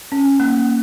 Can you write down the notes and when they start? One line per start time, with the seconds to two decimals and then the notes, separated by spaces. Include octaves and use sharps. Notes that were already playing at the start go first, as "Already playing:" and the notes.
0.12 C#4
0.40 A#3